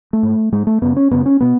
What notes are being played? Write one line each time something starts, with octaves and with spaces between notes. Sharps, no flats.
A3
G#2
G#2 G#3
A3
F#2 C#3 B3
C#4
F#2 C#3 B3
C#4
B2 B3